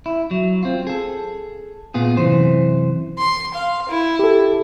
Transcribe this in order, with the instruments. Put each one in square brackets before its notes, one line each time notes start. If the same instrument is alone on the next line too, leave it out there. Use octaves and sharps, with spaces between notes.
[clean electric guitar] E4
F#3
C4 F4
G#4 A4
A#2 B3 F4 G#4
F#2 C3 E3 C5
[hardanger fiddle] C6
F5
E4
[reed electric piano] G4 A4